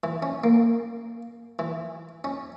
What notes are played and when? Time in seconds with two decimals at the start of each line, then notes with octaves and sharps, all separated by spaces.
0.04 E3
0.22 C#4
0.44 A#3
1.59 E3
2.24 C#4